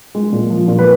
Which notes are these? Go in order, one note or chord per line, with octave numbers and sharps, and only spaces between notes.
G#3
A#2
F3
A#2
B4